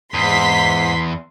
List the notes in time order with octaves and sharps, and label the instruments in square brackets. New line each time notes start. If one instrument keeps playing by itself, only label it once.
[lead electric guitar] E2 [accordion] G#2 [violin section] C6 B6